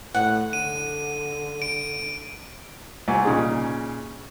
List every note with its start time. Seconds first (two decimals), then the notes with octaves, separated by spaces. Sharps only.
0.14 A2 F#5
0.53 D3 D#7
1.62 D7
3.08 C2 G#5
3.25 A#2 C#3 D#4 G#4